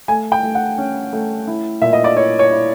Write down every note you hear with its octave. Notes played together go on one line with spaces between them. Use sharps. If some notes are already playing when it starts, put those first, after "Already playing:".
A3 G#5
G5
A3
F#5
C#4
A3
E4
A#2 E5
D#5
D5
E4 C#5
C#5
E4